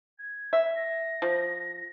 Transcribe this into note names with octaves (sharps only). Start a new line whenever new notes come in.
G#6
E5
A#6
F3